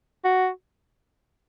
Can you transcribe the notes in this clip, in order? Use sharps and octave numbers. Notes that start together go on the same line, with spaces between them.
F#4